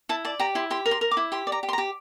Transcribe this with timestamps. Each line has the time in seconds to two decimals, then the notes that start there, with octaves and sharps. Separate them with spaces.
0.09 E4 A5
0.25 D5 A5
0.39 G4 A#5
0.55 E4 C6
0.71 G4 C6
0.86 A#4
0.91 C6
1.01 A#4
1.11 D6
1.17 E4
1.32 G4 C6
1.47 D5
1.52 A#5
1.63 G4
1.69 C6
1.73 A#5
1.78 G4